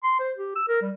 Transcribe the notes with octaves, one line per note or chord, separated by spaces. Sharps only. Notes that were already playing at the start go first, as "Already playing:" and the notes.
C6
C5
G4
E6
A#4
G3